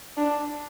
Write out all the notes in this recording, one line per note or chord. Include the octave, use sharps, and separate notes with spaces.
D4